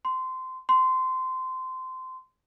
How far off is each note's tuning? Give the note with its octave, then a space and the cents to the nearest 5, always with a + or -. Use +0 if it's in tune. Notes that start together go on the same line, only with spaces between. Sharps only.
C6 -20
C6 -20